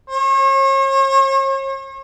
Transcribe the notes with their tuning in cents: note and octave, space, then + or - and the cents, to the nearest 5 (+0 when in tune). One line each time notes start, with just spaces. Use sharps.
C#5 -40